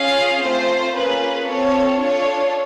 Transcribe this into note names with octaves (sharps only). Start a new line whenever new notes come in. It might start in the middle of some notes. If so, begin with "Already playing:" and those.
Already playing: C#4 F4 G#4 F5
A3 C4 F4 C5
A#3 C#4 F4 G#4 B4
C4 F4 A4 C#5
D4 F4 A4 C#5